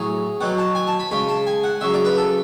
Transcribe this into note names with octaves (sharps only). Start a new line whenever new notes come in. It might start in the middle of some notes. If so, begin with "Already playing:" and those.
Already playing: A2 F#3 G#4
B2 F#3 F#5
A5
G#5
A5
B5
C#3 G#3 B5
A5
G#5
F#5
C#3 F#3 E5
D5
B4
A4